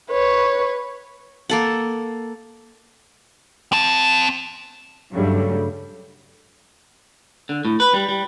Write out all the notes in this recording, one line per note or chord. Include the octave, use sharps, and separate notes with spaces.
B4 C#5
A#3 A4 F#5
C4 A5
G2 C#3 F#3 G3 A3
D3
A2
B4
G3
G3